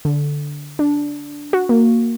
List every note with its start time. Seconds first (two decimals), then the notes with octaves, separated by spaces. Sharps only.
0.05 D3
0.79 D4
1.53 F#4
1.69 A#3